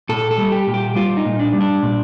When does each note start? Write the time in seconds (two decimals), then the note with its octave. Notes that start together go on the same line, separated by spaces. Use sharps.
0.09 A#2 A4
0.31 A4
0.38 G3
0.52 G4
0.67 A#2
0.74 G4
0.95 G3 F4
1.17 D#4
1.25 A#2
1.39 D4
1.53 G3
1.61 D4
1.83 A#2